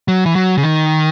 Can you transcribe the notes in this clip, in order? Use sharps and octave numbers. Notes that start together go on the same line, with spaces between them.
F#3
E3
F#3
C#3
D#3